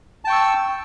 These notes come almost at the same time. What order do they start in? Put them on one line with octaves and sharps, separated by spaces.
A5 G5 C#6 E6